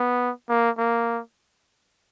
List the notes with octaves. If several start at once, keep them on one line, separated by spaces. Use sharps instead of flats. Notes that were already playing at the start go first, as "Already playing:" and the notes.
Already playing: B3
A#3
A#3